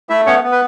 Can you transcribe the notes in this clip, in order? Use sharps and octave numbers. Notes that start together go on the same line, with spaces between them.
A3 E4 E5
B3 C#4 C#5
B3
B4